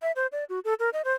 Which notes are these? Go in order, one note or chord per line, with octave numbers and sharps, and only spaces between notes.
E5
C5
D5
F#4
A4
A#4
D#5
C5